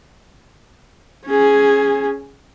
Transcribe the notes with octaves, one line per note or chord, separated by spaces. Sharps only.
C#4 G#4